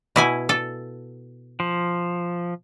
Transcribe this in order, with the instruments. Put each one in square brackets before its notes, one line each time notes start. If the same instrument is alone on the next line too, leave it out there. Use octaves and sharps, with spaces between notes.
[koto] B2 E4 G#5
A4
[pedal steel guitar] F3